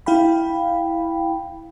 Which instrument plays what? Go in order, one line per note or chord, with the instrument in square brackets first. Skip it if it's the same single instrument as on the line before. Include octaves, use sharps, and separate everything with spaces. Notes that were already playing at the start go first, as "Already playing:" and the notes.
[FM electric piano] E4 F5 G5 B5